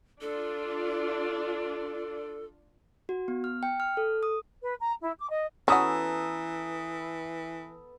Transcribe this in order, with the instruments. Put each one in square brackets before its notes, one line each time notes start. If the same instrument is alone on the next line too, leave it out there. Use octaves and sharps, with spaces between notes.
[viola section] D4 F4 D5 [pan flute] A4
[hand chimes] F#4
B3
F6
G5
F6
A4
D#6
[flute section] B4
A#5
E4
D6
D#5
[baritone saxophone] E3 [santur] B3 A4 E5 [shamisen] C#4 F#4 [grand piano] A#5 D#6